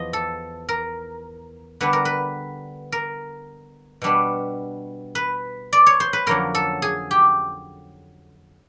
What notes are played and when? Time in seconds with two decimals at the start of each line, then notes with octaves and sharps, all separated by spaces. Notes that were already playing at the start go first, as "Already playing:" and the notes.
Already playing: E2 F3 D#5
0.13 A4
0.69 A#4
1.81 D3 G3 B3 D4 B4
1.93 A#4
2.05 B4
2.92 A#4
4.02 B2 G3 B3 D4
5.15 B4
5.73 D5
5.86 C#5
6.00 C5
6.13 B4
6.26 F2 D3 F#3 A#3 C#4 A#4
6.55 A4
6.82 G#4
7.11 G4